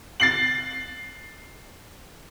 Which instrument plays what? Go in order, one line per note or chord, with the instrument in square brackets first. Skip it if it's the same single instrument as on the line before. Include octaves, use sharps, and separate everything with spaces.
[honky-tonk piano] A6 C7 F#7